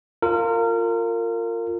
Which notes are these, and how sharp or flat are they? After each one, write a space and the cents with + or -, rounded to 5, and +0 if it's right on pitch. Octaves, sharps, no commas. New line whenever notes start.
F4 +0 A#4 -30